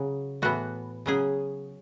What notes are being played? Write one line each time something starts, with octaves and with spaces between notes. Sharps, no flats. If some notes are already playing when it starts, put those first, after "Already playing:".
Already playing: C#3 F#3
A2 E3 B3 F#4
C#3 F#3 C#4 G#4